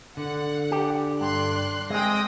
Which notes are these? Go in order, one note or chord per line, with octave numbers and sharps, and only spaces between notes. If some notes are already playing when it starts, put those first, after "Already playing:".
D3 F#5
G4
G2 D5 C6 F#6
G#3 C4 G#4 G5 D#6 A#6